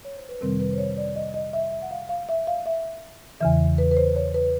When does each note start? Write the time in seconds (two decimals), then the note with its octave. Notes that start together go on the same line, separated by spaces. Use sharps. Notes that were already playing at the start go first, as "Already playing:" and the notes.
0.05 C#5
0.17 C5
0.29 B4
0.41 F2 C3 D#3 G3 C4 A#4
0.60 B4
0.73 C5
0.78 C#5
0.97 D5
1.16 D#5
1.34 D#5
1.53 E5
1.72 E5
1.82 F#5
1.91 F5
2.09 F5
2.29 E5
2.47 F5
2.66 E5
3.40 E2 C#3 E3 E5
3.78 B4
3.91 B4
3.97 C5
4.16 C#5
4.34 B4